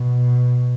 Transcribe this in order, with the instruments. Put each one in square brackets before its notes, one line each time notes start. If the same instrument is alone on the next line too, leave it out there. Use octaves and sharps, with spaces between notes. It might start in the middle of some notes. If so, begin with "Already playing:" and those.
Already playing: [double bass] B2